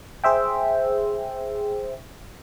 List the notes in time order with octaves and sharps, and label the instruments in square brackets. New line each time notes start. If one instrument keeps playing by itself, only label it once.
[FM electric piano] G#4 C5 E5 G5